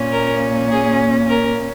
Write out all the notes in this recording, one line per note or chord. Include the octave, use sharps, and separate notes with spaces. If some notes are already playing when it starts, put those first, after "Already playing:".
Already playing: A#2 A#3 C#4
A#4
G#4
A#4